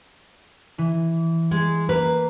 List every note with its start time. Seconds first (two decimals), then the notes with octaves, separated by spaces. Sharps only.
0.78 E3
1.51 G#3
1.89 A#3 B4